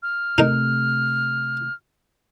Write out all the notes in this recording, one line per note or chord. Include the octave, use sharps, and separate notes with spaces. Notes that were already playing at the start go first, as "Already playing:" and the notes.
F6
C3 A3 D#4 A#4